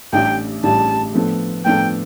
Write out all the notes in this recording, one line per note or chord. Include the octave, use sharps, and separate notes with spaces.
A1 A2 G3 D4 G5
A1 A2 G3 D4 A5
A2 F3 B3 D4 A4
A2 F3 B3 D4 A4 G5